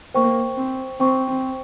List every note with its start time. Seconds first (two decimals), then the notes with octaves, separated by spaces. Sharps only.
0.14 A#3 C5 G5 C#6
0.57 C4
1.00 C4 C5 G5 C#6
1.28 C4